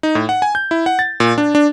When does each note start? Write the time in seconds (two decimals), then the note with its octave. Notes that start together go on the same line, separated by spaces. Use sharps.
0.03 D#4
0.15 A2
0.29 F#5
0.42 G#5
0.55 G6
0.71 E4
0.86 F#5
0.99 A6
1.20 A#2
1.38 D4
1.55 D4